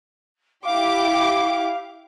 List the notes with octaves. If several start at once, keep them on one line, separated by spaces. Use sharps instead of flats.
E4 G4 F5 D6